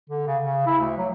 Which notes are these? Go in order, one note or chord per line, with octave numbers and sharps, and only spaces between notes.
D3
C#3
C#3
E4
D2
F#3